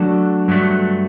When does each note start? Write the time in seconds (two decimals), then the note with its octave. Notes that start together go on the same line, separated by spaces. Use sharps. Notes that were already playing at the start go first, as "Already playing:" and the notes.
Already playing: F#3 A3 D4 F#4 A4
0.48 G2 F#3 A3